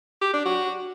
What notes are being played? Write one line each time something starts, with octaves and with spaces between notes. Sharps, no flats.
G4
D4
F#4